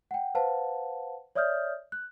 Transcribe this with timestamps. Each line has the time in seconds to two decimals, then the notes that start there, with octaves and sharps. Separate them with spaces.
0.11 F#5 G5
0.35 B4 C5 F5 F#5 A5
1.35 C#5 D5 E5 D#6 F6 G6
1.92 F#6